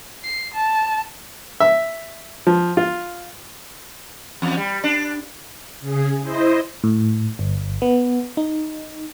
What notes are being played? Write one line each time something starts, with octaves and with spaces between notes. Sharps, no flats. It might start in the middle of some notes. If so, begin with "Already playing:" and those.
C7
A5
E5
F3
F4
E2
G3
D4
C#3 G#4
E4 C5 D#5
A2
G1
B3
D#4